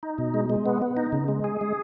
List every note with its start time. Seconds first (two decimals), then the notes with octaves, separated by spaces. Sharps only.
0.03 D#4
0.18 B2
0.34 G#3
0.50 G#3
0.66 B3
0.82 B3
0.97 D#4
1.12 C#3
1.28 G#3
1.44 G#4
1.61 G#3